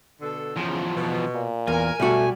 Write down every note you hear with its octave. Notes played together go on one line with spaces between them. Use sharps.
B2 D3 A4
E2 C#3 F3
B2
A#2
E2 A#4 G#5
B1 G3 A3 F#4